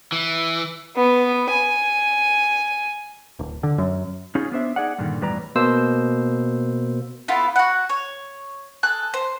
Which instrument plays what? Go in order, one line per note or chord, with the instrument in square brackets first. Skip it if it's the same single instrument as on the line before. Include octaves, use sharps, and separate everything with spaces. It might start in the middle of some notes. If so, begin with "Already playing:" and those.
[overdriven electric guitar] E3
[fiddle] B3
G#5
[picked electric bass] D1
D3
F#2
[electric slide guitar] C#4 D#4 F4 G#4
B3 D4 C5 E5
D#4 G#4 D5 F#5
G2 A#2 D3 D#3
E2 A2 G3 B4 D5 A#5
[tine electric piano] B2 A#3 C5 E6
[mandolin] B3 E4 F4 A4
F#4 F#5
C#5
G#4 A4 F#6
C5